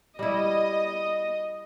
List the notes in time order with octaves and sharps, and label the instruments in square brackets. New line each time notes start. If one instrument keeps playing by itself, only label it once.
[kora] G3 E4 [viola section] D#5